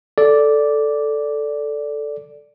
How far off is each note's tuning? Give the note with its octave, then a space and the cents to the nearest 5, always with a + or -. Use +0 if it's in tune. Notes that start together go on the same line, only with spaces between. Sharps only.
A4 +0 D5 -5